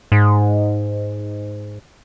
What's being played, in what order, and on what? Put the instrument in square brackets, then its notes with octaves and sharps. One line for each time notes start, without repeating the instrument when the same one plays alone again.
[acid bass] G#2